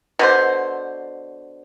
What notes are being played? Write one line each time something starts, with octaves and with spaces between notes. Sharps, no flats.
B2 D3 C5